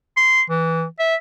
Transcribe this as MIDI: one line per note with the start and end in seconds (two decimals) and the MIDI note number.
0.17 0.42 84
0.50 0.85 52
0.99 1.16 76